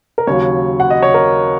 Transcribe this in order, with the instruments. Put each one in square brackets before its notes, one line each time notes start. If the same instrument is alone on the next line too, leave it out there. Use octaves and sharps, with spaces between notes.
[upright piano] A#4
D#2 C#3 F#3 C#5
F#5
D#5
C#5
A#4